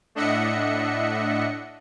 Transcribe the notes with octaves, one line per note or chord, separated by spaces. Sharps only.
A2 D4 D#5 E5 F#5 C#7